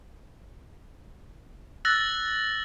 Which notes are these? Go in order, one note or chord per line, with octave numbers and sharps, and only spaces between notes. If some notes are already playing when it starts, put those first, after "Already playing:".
E6 F#6 A6 A#6 F#7